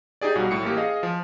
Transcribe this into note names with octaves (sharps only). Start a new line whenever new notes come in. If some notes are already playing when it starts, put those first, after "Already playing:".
D#4 G4 G#4 D5
B1 F#3 G3 F#4
A2 C#7
A1 A#3 G4
G#4 D#5 F5
F3